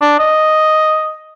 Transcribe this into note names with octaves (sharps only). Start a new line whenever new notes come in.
D4
D#5